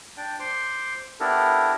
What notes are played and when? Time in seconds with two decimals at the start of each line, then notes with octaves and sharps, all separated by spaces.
0.17 D4 D5 G5
0.40 C5 C6 D6
1.20 B3 D4 E4 G4 A4 A#4